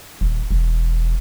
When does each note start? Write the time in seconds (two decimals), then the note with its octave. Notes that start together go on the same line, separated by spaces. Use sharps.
0.21 D#1
0.51 E1